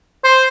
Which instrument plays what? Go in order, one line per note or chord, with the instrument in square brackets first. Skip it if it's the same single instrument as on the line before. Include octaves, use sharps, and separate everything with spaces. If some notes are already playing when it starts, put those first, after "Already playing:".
[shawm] C5